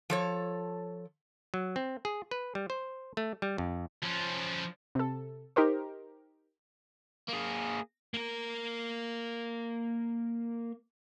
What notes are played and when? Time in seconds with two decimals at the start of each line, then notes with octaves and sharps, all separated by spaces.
0.10 F3 A4 C#5
1.54 F#3
1.76 C4
2.05 G#4
2.31 B4
2.55 G3
2.70 C5
3.17 A3
3.42 G3
3.58 F2
4.03 F3 C#4
4.95 C3 A4
5.56 D#4 G4 A#4 C5
7.28 A#3 G#4
8.14 A#3 A#4